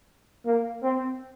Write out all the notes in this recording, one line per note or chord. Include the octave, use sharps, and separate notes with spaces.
A#3
C4